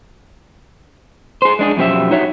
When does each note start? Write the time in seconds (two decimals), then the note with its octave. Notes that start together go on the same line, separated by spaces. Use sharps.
1.42 G#4 C5
1.59 G#3 D4 G#4
1.77 F#2 B2 F3 G4 E5
2.11 D#4 F#4 C#5 E5